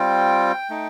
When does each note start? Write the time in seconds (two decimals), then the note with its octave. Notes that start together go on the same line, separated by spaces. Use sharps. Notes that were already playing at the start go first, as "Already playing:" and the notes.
Already playing: G3 C4 F4 G5
0.70 A3 D#4